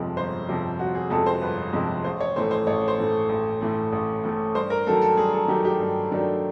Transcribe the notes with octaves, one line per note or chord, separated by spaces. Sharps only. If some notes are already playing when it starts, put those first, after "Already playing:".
Already playing: G1 F2 C3 F3 G#3
G1 C5
F2 C3 F3 G#3
G1 F#4
G#4
F2 C3 F3 G#3 A4
C5
G1 B4
F2 C3 F3 G#3
A1 C5
C#5
A2 E3 A3 C5
C5
A1 C#5
C5
A2 E3 A3
A1
A2 E3 A3
A1
A2 E3 A3
G2 C5
A#4
D#3 F#3 A3 A4
A4
G2 G#4
A4
D#3 F#3 A3 G4
G4
G2
D#3 F#3 A3 D4